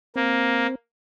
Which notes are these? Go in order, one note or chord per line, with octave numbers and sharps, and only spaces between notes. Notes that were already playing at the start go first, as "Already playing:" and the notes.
A#3 C4